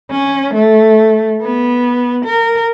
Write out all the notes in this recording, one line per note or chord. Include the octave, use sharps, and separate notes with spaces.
C#4
A3
B3
A#4